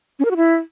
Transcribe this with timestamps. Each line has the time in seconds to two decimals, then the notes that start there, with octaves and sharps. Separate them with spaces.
0.19 C#4
0.25 A#4
0.31 F#4
0.36 E4